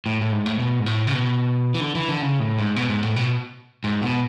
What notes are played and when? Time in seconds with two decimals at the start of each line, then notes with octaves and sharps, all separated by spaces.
0.06 A2
0.21 A2
0.32 G#2
0.46 A2
0.59 B2
0.79 G#2
0.86 A2
1.07 C#3
1.14 B2
1.74 E3
1.80 D3
1.95 E3
2.09 D3
2.22 C#3
2.40 A2
2.58 G#2
2.76 B2
2.90 G#2
3.03 A2
3.16 B2
3.84 G#2
4.02 B2